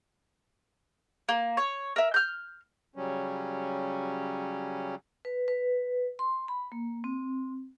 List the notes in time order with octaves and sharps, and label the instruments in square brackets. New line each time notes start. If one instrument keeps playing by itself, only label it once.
[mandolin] A#3
C#5
A#4 E5
F6 G6
[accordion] C#3 F#3 G3 C#4
[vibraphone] B4
B4
C6
B5
A#3
C4